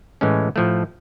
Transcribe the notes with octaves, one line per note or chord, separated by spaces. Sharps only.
A2 E3 G#3 C#4
A2 F3 A3